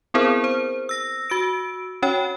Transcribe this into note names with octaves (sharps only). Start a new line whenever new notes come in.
B3 C4 E4 G#4 A#4 C5
C5
E6 A#6
F#4 E6 D7
C#4 F#4 C#5 G5